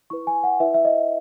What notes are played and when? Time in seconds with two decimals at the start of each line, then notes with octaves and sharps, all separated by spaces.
0.10 E4 B4 C#6
0.27 G#5
0.44 F#5
0.60 E4 B4 E5
0.74 E5
0.85 D#5